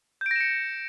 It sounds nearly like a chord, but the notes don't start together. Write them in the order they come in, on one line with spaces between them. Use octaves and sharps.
G6 D7 A#6 E7 C#7